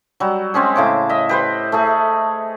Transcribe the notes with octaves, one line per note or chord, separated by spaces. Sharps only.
F#3 G3
G#3 C4 C#4 G#4
A2 C#3 D6
D#5 E5
G4 B4 C5
A3 G#4